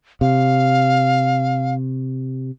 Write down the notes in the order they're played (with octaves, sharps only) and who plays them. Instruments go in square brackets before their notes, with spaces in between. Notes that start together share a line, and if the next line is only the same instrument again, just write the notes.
[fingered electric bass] C3 [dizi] F5